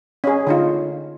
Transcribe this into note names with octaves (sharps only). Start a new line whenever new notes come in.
C#4 G#4
D3 D#4 F4